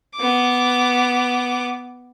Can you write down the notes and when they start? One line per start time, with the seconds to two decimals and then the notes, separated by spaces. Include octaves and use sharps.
0.16 B3 D6